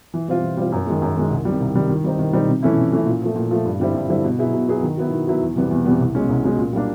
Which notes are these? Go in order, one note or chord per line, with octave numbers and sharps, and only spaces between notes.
E3
G3 C4 F4
E3
G3 C4 F4
F#2
D#3 G#3
F#2
D#3 G#3
C2
C3 D#3 G3
C2
C3 D#3 G3
D#3
G3 C4 D#4
D#3
G3 C4 D#4
C3
E3 A3 C#4 E4
C3
E3 A3 C#4 E4
A#2
F3 A3
A#2
F3 A3
G2
D3 G3 C4 E4
G2
D3 G3 C4 E4
B2
F#3 B3 E4 G#4
B2
F#3 B3 E4 G#4
D#3
F#3 B3 E4
D#3
F#3 B3 E4
E2
C3 E3 G3 B3
E2
C3 E3 G3 B3
C2
B2 G#3 C#4
C2
B2 G#3 C#4
A#2
G3 A#3 D4